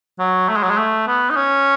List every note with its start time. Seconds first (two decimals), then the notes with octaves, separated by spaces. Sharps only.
0.19 F#3
0.49 A3
0.56 G#3
0.63 F#3
0.70 G#3
0.77 A3
1.07 B3
1.30 D#4
1.36 C#4